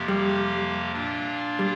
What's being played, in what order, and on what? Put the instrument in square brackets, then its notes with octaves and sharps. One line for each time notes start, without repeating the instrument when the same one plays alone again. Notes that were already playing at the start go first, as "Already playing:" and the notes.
Already playing: [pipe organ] F2 C3 F3 A#3 G4
[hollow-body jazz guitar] G3
[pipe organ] A#2 A#3 D4 F4
[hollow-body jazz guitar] G3